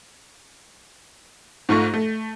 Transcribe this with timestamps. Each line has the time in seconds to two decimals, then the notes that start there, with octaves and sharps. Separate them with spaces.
1.69 G#2 A3 F4 C#6 A#6
1.93 A3